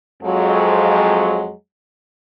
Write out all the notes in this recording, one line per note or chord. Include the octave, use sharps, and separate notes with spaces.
F2 F#3 G#3